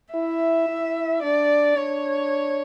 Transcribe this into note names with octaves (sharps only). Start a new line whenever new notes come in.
E4 E5
E4
D4 D5
D4 C#5